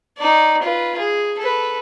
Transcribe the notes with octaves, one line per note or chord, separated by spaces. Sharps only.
D#4 D5
F4 B4
G#4
A4 B4